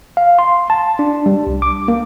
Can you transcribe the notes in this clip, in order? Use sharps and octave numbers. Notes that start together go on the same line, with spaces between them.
F5
C6
A5
D4
G3
C2
D6
A#3